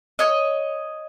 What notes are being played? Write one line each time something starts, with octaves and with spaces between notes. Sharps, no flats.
C#5 D#5